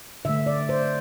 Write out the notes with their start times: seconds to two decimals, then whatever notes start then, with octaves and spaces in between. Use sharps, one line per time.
0.25 D3 A3 E5
0.46 D5
0.69 C5